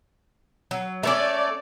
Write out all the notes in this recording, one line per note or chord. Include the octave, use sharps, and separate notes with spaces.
F#3
A3 B3 C#4 D5